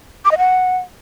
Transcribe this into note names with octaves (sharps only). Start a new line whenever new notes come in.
D6
D#5
F#5